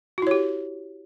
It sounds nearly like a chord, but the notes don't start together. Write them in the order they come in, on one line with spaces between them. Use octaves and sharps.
F#4 E4 C#5 G4